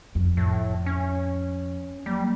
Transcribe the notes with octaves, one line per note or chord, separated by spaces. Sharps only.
F2
A2
C#4
F#3 G3 A#3